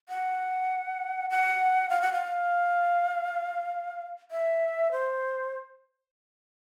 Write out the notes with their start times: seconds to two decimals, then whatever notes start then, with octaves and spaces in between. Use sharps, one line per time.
0.09 F#5
1.30 F#5
1.90 F5
2.01 F#5
2.13 F5
4.31 E5
4.92 C5